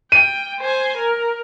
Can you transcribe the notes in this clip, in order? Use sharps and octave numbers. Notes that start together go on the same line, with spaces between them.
G5 D#7
C5 G#5
A#4